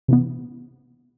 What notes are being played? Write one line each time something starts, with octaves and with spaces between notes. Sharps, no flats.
C3 E3 B3